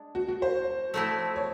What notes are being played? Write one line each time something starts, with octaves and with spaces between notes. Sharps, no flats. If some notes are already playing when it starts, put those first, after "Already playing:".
Already playing: G#3 D4
F#4
F#4
C5
F3 A3 C4 E4
C#5